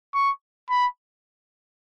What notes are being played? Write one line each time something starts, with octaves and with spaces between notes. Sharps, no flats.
C#6
B5